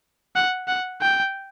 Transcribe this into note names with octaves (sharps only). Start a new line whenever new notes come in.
F#5
F#5
G5